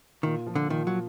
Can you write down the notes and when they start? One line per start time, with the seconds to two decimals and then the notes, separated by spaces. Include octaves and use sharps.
0.23 A#2 D#3
0.47 F3
0.55 D3
0.70 A#2 D#3
0.87 F#3